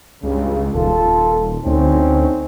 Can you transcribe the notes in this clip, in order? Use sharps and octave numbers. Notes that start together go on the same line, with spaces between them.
C#2 G2 C#3
D#1 F4 A4
D2 C4 C#4 D#4